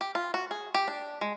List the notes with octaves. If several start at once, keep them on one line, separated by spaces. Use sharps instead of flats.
G4
F4
F#4
G#4
G4
D4
G#3